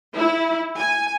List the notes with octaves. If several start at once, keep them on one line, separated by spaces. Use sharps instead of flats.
E4
G#5